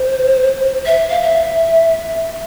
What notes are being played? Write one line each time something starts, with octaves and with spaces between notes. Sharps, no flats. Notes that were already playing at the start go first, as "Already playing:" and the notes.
Already playing: C5
E5
F5
E5